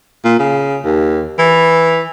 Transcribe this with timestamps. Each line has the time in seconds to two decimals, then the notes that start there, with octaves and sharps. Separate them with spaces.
0.24 A#2
0.39 C#3
0.84 D#2
1.39 E3